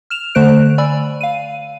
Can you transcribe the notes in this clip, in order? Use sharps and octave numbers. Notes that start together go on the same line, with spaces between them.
F6 E7 F7
D3 A3 C5 F#6 D7
D5 G#5 B5 E6
F5 D#7